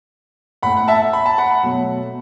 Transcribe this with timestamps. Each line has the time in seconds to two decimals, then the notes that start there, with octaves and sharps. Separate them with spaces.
0.62 A2 A3 F#5 B5
0.77 F#5
0.88 E5 A5
1.13 B5
1.26 A5
1.38 F#5 B5
1.63 B2 F#3 A3